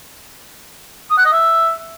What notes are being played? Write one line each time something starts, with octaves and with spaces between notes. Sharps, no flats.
D#6
F#5
D#5
E5